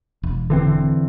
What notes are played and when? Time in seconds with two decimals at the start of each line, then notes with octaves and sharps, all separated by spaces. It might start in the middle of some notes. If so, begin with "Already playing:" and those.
0.23 E1
0.50 D3 E3 C4